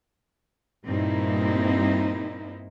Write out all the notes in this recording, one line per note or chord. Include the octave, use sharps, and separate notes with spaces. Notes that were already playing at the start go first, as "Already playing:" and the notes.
G2 A#2 A#3 C4 D#4 E4